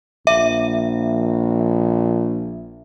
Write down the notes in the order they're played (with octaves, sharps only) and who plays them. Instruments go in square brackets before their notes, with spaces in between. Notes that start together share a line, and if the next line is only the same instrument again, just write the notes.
[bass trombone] A#1 [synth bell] E5